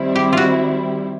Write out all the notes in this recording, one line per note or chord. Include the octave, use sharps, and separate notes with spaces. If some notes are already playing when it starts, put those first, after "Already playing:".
Already playing: D#3 G3 C4 E4
G4
F4 F#4